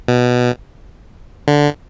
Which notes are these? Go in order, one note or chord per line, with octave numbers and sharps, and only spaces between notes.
B2
D3